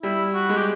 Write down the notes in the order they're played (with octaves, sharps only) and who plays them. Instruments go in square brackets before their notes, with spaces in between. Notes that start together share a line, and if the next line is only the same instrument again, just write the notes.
[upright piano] G3 [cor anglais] E4
[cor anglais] F#4
[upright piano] G#3
[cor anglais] G4